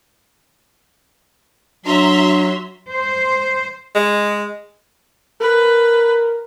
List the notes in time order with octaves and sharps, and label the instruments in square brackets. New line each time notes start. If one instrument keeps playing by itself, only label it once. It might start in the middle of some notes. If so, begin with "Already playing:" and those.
[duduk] F#3 [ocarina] D4 [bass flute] F#4 [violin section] E5 A#5 C6
[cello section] C5
[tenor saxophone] G#3
[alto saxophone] A#4 [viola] B4